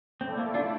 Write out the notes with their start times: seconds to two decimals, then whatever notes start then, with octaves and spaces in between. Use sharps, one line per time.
0.21 A3 C4 E4 A4 D5
0.38 A#3
0.54 D4 F4